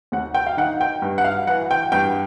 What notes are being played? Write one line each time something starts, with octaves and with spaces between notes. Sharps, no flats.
D#2 F#5
G5
F5
D#3 F#5
G5
G2
F#5
F5
E3 F#5
G5
G2 G5